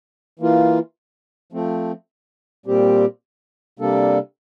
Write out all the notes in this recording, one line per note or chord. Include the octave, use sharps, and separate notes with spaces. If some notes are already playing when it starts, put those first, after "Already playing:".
E3 A#3 F4
F3 A3 C4
A#2 G3 C4 G4
C3 G3 A#3 D4 A4